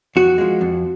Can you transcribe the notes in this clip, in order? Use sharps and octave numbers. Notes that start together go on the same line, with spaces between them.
F2 F#4
F3 G#3
F2